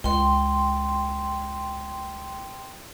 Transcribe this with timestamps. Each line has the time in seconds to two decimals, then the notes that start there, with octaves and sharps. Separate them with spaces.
0.04 C#2 G5 C6